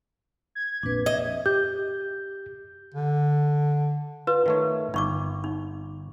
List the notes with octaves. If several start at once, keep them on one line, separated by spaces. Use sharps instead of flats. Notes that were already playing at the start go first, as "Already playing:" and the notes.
G#6
A#1 F2 D4 B4
D#5 E5
G4 G6
D3
F4 B4
D#3 A3 C#5
G1 D#4 C#6 D6
D#4